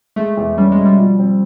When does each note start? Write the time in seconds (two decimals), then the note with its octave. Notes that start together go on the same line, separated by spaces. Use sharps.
0.16 G#3 A3
0.37 E2
0.58 G3 C#4
0.72 G#3
0.78 B2
0.85 G3
0.99 F3
1.19 C4